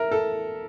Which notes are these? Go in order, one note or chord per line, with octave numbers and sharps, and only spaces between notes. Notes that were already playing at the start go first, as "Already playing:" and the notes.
Already playing: A#4 E5
A4